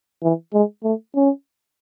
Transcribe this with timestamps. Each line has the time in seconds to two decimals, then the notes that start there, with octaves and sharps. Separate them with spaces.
0.23 E3
0.54 G#3
0.84 A3
1.15 C#4